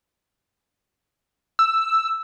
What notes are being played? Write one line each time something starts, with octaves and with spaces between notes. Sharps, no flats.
E6